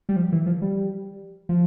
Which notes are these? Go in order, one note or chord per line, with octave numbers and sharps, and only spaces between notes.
G3
F3
E3
F3
G3
F3